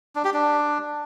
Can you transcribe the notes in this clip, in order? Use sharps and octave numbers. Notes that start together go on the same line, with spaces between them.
D4
G4
D4